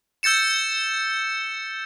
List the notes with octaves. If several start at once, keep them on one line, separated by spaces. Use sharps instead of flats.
E6 G6 A6 C#7 E7